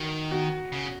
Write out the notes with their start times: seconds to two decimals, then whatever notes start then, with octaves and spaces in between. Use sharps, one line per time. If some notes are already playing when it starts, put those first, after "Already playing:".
Already playing: D#3 F#4
0.31 F#4
0.72 C#3